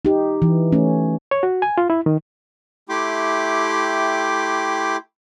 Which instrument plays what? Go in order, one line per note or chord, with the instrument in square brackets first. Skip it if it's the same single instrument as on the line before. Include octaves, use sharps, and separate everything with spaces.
[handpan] D#4 G4
E3
A3 C#4
[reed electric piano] C#5
F#4
G#5
F4
E4
D#3
[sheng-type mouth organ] A3 E4 G4 G5 C6 D6